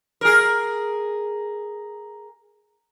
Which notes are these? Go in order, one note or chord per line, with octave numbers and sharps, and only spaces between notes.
G#4 A#4